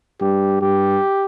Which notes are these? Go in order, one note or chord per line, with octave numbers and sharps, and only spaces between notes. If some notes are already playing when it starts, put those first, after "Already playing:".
G2 G4
G2 G4